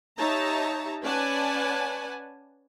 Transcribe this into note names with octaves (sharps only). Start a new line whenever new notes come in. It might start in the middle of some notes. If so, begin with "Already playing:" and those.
D#4 G4 C#5 E5 A5 A#5
C#4 B4 D5 F#5 G#5 A5